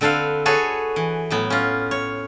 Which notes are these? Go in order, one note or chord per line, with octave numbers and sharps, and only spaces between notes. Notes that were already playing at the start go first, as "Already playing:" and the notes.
D3 C4 A4 B4 F5
F#4 G#4 A4 B4 C#5
E3
A2 F#3 B3
C#4 F4
C#5